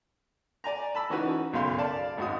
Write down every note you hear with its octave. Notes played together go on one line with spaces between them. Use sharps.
D5 G#5 A#5
A5 B5 E6
E3 C#4 D#4 F#4 B4
B1 F#2 C#3 F5 C6
D5 F5 A5
G#1 F#2 F#4 D#6